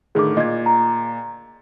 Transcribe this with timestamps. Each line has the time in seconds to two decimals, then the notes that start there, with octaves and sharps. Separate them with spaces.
0.15 A2 D3 D#3 G#4 D6
0.37 A#2 D#5 G#6
0.66 A#5